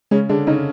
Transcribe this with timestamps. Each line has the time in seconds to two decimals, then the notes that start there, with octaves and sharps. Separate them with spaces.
0.11 C#3 G#3 C#4
0.29 D3 G#3 D4
0.47 C#3 C#4 D#4